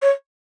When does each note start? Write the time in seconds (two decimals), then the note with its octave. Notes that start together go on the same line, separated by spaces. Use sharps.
0.02 C#5